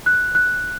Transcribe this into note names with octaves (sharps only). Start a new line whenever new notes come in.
F#6
F#6